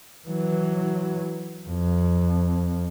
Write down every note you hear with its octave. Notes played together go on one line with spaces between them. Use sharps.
E3 F#3
F2